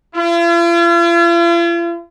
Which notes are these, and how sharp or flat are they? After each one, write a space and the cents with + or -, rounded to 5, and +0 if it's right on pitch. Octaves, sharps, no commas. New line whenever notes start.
F4 -45